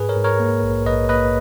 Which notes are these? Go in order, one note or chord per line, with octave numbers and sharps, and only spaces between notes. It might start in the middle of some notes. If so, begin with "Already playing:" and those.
Already playing: G#2 G#4 B4
A#4 C#5
G#2
A#4 C#5
A#3
A#1
A#1 B4 D#5
A#3 B4 D#5